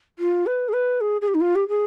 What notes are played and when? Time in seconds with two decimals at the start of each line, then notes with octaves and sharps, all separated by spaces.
0.18 F4
0.46 B4
0.68 G#4
0.73 B4
1.00 G#4
1.21 G#4
1.28 G4
1.34 D#4
1.40 F4
1.55 G4
1.68 G#4